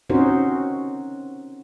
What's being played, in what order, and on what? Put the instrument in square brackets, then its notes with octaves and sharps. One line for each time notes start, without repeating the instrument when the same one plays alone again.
[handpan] C4 C#4 D#4 F#4 A#4 C5